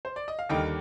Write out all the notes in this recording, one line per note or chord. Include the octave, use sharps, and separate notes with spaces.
C5
D5
D#5
F5
D#2 D3 G3 A#3 D#5 G5